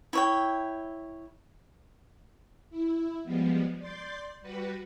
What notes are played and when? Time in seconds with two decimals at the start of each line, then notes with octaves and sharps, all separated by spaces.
0.13 E4 C#5 G5
2.70 E4
3.24 F3 G3 G#3 B3
3.79 D5 C6 D6 G6 A6
4.41 G3 F#4 B4